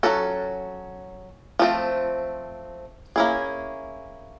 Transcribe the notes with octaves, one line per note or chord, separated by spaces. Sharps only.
F#3 A#3 C#4 F#4 A4
F3 A3 C4
A#3 C#4 E4 G#4